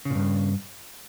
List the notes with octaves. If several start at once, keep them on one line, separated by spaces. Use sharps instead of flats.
G2 A#2 C#3